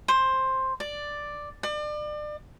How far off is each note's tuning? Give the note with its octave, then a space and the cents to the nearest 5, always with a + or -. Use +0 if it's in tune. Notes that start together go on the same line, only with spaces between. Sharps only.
C5 +10
D5 +5
D5 +35